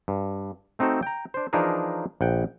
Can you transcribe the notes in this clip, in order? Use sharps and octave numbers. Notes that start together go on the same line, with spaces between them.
G2
A3 C4 D#4 F#4 A4
G5 A#5
D4 C5
E3 F3 D4 D#4 G#4 A#4
A#1 F#5 G5